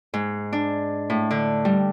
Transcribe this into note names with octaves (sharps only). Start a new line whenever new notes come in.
G#2
D4
A2
D3
G3